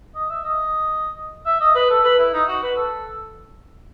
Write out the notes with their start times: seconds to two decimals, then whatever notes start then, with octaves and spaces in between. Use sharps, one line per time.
0.15 D#5
0.29 E5
0.44 D#5
1.45 E5
1.60 D#5
1.75 B4
1.90 A4
2.03 B4
2.18 E4
2.33 D#4
2.48 F#4
2.63 B4
2.76 A4